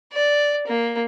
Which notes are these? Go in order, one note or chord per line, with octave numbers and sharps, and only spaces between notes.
D5
A#3